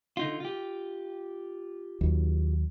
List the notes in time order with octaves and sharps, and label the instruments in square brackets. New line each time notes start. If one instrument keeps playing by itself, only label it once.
[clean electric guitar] D3 D#4 F4
F4 G4
[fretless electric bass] D#2 F#3